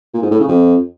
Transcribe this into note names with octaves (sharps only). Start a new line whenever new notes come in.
A#2
G#2
A2
C#3
F2